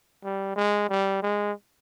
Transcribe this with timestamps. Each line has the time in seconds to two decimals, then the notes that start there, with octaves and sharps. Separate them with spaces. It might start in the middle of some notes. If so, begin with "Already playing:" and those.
0.24 G3
0.56 G#3
0.89 G3
1.23 G#3